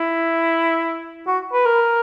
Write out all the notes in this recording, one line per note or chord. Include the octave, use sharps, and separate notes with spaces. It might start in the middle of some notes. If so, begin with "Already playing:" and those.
Already playing: E4
F#4
B4
A#4